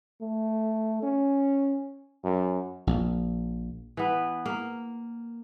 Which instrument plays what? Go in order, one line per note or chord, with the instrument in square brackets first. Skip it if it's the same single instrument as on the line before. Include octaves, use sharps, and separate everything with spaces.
[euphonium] A3
C#4
F#2
[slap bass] A#1
[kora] E3 B3
A#3